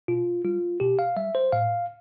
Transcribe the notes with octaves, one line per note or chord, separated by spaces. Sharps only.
B2 F4
G3 F4
B2 G4
F5
G3 E5
C5
A2 F5